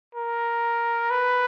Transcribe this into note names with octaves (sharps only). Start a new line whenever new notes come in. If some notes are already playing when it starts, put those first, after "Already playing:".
A#4
B4